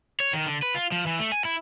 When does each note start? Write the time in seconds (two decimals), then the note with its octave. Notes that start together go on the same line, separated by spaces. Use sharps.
0.20 C#5
0.33 D#3
0.46 D3
0.63 B4
0.75 F4
0.92 F3
1.06 E3
1.19 A3
1.32 G#5
1.45 E4